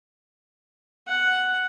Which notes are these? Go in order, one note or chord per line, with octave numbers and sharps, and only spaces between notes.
F#5